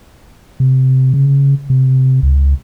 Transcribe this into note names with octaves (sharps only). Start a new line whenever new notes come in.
C3
C#3
C3
C#2